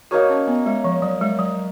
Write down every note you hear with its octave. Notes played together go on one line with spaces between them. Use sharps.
A#3 D#4 F#4 A#4 C#5
C#4
B3
G#3
F3
F#3
G#3
F#3